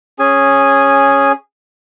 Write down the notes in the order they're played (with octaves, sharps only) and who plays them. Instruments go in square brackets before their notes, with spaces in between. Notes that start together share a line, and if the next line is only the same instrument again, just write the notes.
[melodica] C#4 G#4 G#5